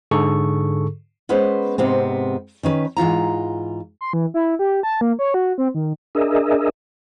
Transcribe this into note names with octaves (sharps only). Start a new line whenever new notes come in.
G#2 D3 G#4 A4 C#6
G#3 B3 C#4 B4 C5
G#2 C3 B3 C4
D#3 C#4 B4
G#2 E3 F4 A#5
C6
E3
E4
G4
A5
A#3
C#5
F#4
C4
D#3
D4 G#4 A#4 D#5 E5